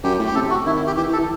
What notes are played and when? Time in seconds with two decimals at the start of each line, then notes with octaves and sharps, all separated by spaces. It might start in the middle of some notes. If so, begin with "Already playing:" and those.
0.04 F#2 G4
0.19 A2
0.26 G4
0.35 C3 A4
0.50 F#4
0.66 D#3 E4
0.76 E4
0.87 G4
0.97 E3 G4
1.07 E3
1.13 A4
1.18 E3